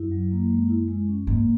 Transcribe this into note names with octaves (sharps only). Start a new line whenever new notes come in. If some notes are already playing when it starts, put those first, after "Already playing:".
Already playing: F#2 E4
F#3
A#3
G#3
E4
G#3
C#4
G#2 A#3